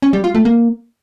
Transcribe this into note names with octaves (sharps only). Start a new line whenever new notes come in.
C#4
G3
F4
A3
A#3